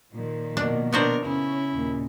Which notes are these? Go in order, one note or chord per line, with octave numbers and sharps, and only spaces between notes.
A#2 D#3 F3
B2 A#3 D4
B3 D4 F#4 A#4 C5
C#3 C#4 E4
D#2 A#2